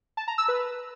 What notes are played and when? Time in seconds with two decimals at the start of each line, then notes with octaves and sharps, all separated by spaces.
0.17 A5
0.28 A#5
0.38 E6
0.48 B4